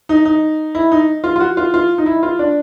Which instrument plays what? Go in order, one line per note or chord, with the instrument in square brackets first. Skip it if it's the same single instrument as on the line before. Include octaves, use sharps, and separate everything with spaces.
[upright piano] D#4
D#4
E4
D#4
F4
F4
F#4
F4
F4
D#4
E4
F4
D4